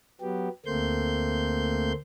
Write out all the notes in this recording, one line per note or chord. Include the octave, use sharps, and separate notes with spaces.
F#3 B3 G4
D2 A3 A#3 C4 C6 G6